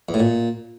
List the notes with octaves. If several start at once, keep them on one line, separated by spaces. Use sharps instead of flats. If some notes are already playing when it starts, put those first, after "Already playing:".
E2
A2
A#2